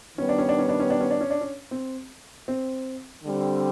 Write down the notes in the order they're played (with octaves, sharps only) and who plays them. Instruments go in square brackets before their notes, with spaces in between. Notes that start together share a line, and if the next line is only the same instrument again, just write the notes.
[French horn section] D#3 G3 B3 [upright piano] C#4
[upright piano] D4
C#4
D4
C#4
D4
C#4
D4
C#4
D4
C#4
D4
C#4
C4
C4
[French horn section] D3 G3 C4